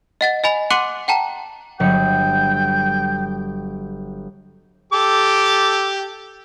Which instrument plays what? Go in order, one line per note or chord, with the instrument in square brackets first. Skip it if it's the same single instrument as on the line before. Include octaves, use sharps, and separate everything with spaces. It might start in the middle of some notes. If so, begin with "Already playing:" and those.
[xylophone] D#5 F#5 A6
D#5 G#5 B5
F#5 C6 D6 F#6 C#7 D#7
F#5 G5 A5 A#5
[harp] G1 F#3 C#7 [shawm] G5
[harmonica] G4 A4 D6